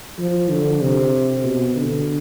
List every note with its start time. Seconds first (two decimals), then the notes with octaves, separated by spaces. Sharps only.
0.19 F3
0.49 D3
0.81 C3
1.44 B2
1.76 D3